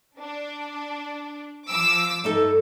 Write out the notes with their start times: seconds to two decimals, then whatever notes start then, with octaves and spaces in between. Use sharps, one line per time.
0.18 D4
1.69 F3 D6 E6
2.24 G2 A3 D#4 A4